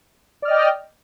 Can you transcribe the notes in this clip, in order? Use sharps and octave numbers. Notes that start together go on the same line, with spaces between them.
D5 D#5 G5 F6